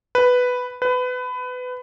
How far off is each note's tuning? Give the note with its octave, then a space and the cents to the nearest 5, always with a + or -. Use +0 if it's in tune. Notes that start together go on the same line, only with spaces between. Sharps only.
B4 +5
B4 +25